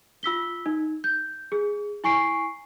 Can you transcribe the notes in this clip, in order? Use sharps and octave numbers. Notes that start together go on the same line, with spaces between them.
F4 E6 B6 G7
D#4
G6
G#4
E4 G#5 C#6 C7 D7